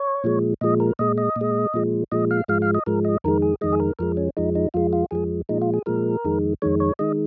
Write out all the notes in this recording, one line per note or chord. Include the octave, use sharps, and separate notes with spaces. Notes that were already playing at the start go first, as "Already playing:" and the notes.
Already playing: C#5
A#2 F3 G#3
A#2 F3 G#3 D#5
A#4
A#2 G#3 D#5
D#5
A#2
G#3
A#2 F3 G#3
A#2 F3 G#3 D#5
F5
G#2 F3 G#3 F5
F5
D#5
G#2 F3 G#3 A#4
D#5
F2 D#3 G#3 A#4
G#4
F2 D#3 G#3 D#5
G#4
A#4
F2 F3 G#3 A#4
C#4
F2 F3 G#3 D#4
D#4
F2 F3 G#3 F4
F4
F2 F3 G#3 G#4
A#2 F3 G#3 D#4
F4
G#4
A#2 F3 G#3 A#4
F2 D#3 G#3
F2 D#3 G#3 C#5
C#5
D#3 G#3 D#5